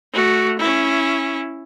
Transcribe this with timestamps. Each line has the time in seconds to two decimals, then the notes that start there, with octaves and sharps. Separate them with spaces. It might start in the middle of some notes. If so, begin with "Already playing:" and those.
0.13 A3 F#4
0.59 C#4 E4